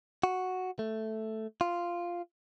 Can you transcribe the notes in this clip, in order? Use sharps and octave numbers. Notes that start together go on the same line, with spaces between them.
F#4
A3
F4